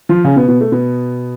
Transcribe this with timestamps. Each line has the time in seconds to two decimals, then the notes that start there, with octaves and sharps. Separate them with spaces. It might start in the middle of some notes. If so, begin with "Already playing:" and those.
0.09 F3 F4
0.24 C#3 C#4
0.36 B2 B3
0.48 B2 B3
0.61 A3
0.72 B2 B3